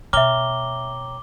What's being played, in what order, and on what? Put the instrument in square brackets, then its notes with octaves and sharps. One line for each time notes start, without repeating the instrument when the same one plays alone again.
[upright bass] B2 [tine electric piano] C#5 G5 A#5 [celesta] E5 F6 [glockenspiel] D6 G7